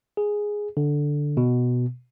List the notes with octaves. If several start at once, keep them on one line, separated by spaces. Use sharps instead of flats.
G#4
D3
B2